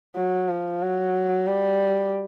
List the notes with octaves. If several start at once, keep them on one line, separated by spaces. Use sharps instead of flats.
F#3
F3
F#3
G3